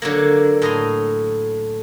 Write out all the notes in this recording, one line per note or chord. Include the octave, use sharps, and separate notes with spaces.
D3 F#3 A#3
A2 D#5 A#5 C6